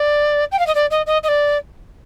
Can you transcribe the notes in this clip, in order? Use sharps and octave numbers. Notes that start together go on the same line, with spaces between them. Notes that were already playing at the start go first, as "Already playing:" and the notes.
Already playing: D5
G5
F5
D#5
D5
D#5
D#5
D#5
D5